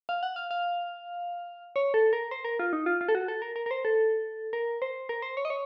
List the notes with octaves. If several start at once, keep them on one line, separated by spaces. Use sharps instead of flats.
F5
F#5
F5
F5
C#5
A4
A#4
C5
A#4
F4
D#4
F4
F4
A4
F#4
A4
A#4
A#4
A#4
C5
A4
A#4
C5
A#4
C5
C#5
D#5
C#5